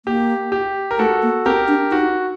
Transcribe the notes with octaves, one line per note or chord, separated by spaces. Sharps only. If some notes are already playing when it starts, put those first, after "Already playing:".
A#3 G4
G4
A#4
A3 F#4 A4
A#3
C4 G4 A#4
D4
D#4 F#4